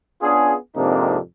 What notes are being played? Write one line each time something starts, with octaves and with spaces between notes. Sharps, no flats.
B3 C#4 D4 F4 G#4
F2 G#2 C3 A#3 D4 D#4